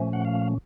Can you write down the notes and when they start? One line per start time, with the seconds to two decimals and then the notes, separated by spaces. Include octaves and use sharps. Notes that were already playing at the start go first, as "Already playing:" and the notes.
Already playing: A#2 F3 A3 C#4
0.13 F#5
0.25 F5